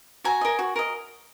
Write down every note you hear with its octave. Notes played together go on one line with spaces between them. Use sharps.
F#4 G#5 A#5
A#4 D#5
F#4
A#4 D#5